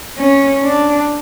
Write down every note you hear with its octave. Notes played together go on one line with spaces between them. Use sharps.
C#4
D4